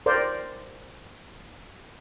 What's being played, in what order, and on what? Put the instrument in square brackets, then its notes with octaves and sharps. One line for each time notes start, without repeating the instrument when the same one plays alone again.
[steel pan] A#4 C5 D5